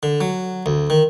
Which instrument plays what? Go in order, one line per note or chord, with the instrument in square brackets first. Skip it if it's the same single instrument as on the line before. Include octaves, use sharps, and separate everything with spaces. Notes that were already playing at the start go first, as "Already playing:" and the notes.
[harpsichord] D3
F#3
D2
D#3